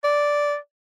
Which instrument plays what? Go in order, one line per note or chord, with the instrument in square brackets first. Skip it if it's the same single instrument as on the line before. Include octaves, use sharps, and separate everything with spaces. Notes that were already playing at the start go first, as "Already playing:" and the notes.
[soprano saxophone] D5